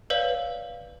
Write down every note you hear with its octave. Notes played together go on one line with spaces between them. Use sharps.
B4 C#5 D5 F5